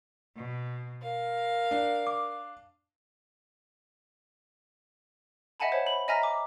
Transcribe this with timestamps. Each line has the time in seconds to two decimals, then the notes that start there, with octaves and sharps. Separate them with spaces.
0.36 B2
1.03 A#4 F5
1.71 D4
2.07 D6
5.60 D#5 E5 F#5 G#5 A5 B5
5.72 C5 C#5 A5
5.87 B5
6.08 D#5 E5 G#5 A#5 F6 A#6
6.23 D6